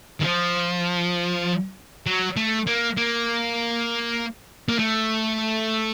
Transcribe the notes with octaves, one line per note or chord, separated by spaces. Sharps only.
D#3
F3
F#3
A3
A#3
A#3
A#3
A3